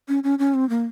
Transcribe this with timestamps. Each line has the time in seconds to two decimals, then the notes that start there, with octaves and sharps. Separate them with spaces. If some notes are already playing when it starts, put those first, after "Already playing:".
0.08 C#4
0.24 C#4
0.39 C#4
0.54 C4
0.70 A#3